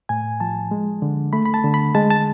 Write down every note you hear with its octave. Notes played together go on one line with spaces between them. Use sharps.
A2 G#5
F3 A5
G#3
D3
A3 B5
B5
A5
D3
B5
G#3 A5
A5